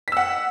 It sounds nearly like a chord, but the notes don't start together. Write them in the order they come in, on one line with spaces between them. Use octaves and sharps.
B6 E6 F#5